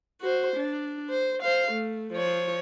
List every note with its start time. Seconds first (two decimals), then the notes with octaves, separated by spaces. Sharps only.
0.21 F#4 C5
0.57 D4
1.10 C5
1.43 C5 F5
1.72 A3
2.13 F3 C#5